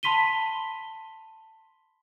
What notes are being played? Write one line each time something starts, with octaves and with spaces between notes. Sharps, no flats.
A5 B5 C6 B6 D#7 G7